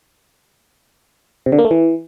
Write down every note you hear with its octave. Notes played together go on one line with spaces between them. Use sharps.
C3
D3
A#3
A3
E3